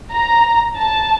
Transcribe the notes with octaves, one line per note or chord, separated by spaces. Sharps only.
A#5
A5